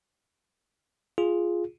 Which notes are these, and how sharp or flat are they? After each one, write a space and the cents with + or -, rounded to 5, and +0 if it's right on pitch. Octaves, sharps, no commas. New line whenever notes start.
F4 +0 G#4 +0